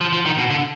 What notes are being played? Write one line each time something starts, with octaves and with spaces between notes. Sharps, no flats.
F3
F3
D#3
B2
D3